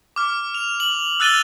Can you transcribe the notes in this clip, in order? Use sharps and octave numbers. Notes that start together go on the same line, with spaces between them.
D6 F6
F7
F#7
E6 F#6 A6 D#7 F7 G7